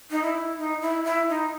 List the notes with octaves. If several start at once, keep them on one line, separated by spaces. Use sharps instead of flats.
D#4
E4
D#4
E4
E4
D#4